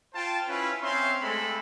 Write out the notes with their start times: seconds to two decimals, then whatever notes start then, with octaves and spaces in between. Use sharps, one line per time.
0.14 F4 C5 G5 A5
0.47 C#4 E4 F4 B4
0.82 C4 C#4 E5 F5 C6
1.21 G#3 A3 C4 A4 B5